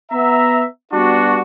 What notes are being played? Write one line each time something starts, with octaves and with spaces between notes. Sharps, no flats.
B3 E5 A#5
G3 B3 D4 F#4